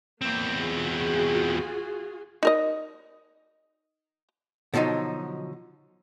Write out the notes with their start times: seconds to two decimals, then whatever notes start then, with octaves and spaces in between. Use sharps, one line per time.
0.21 E2 A#3 C4
0.59 F4 F#4 G#4
2.43 D#4 A#4 D#5
4.74 B2 D3 F3 F#3 D#4